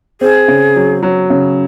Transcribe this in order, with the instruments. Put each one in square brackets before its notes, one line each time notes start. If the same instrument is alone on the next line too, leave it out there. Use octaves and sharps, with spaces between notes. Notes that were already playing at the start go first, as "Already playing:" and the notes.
[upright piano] C4 [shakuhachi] G#4
[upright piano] C#3
F#3
F#3
C#3